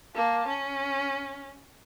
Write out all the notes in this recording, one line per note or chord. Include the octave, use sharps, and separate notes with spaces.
A#3 A5
C#4